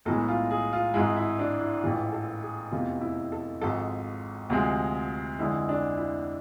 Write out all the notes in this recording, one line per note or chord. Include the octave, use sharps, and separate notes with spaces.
B1 A2 E3 G#3 A4
F4
G#4
F4
G#1 G#2 G#3 E4
E4
D4
E4
A1 G#2 E3 F4
A4
G#4
F1 E2 C3 E3 A3 F4
E4
A4
G#1 G#2 F3 G#3 A4
D2 C3 F3 G#3
F1 F2 D3 G#3 E4
D4
E4